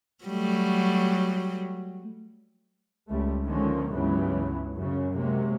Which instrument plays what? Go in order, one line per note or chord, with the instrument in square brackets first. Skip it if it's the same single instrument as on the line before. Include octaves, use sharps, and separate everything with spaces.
[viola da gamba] F#3 G3 A3
[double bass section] C#2 G3 A3
D3 D#3 F3 G#3 A#3 C#4
C#2 G2 C#3 E3 F#3 B3
F#2 C#3
C3 F#3 G#3 A#3